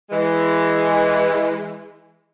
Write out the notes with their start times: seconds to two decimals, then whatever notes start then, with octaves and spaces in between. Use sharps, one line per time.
0.10 E3 G#3